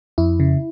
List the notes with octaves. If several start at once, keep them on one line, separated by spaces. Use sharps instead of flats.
F2 E4
C#3